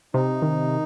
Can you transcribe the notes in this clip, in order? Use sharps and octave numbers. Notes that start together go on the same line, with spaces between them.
C3 D#4
D#3